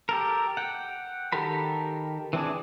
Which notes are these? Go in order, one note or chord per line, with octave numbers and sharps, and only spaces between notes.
G4 A4 A#4
F#5 G5
D#3 G4 A4 A#4 B5
E3 C4 D4 G#4